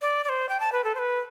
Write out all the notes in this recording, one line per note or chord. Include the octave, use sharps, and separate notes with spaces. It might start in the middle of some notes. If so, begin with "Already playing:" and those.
D5
D5
C5
G5
A5
B4
A4
C5
B4